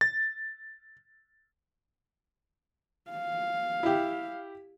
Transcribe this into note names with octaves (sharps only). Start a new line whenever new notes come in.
A6
F5
E4 G4